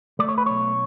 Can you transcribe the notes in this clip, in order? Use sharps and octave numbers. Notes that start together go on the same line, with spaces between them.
A3 D5
C#5
B4
B1 C#5